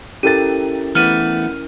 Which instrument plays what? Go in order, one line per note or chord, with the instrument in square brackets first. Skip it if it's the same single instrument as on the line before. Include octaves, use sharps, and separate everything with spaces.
[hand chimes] C#4 E4 A#4 [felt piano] G4 A4 A6 [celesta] D#7
[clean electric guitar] E3 A3 B3 [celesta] F6 D#7